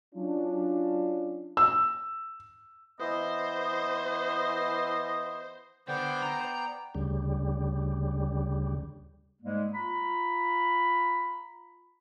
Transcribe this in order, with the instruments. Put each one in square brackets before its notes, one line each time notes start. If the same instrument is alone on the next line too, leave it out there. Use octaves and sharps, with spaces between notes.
[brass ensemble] F#3 C#4 D4 F4
[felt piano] E6
[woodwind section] E3 B3 D#5 [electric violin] C5
[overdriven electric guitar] D3 [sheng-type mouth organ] B3 D5 G5 [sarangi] C5
[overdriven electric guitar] A#5
[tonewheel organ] D2 C#3 G3
[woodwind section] G#2 G3 G#3 A#3
F4 A#5 B5